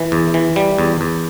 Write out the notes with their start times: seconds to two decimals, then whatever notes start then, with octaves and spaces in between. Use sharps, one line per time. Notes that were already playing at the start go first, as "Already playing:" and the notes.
Already playing: E3
0.12 E2
0.34 E3
0.56 G3
0.78 E2
1.01 E2